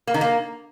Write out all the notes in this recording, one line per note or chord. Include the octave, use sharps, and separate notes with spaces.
A#3
D#3
A#3